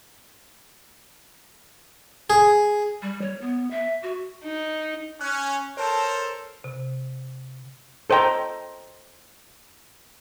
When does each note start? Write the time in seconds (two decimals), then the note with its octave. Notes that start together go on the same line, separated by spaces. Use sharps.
2.30 G#4
3.02 G3
3.21 C#5
3.41 B3
3.71 E5
4.03 F#4
4.43 D#4
5.21 C#4 F#6
5.77 A4 A#4 C5 C#5 A5
6.64 C3
8.10 A4 C5 D#5 G5 A#5